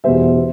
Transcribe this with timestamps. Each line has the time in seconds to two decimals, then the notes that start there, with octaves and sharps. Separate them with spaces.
0.04 E2 B2 G3 C5 E5
0.36 B3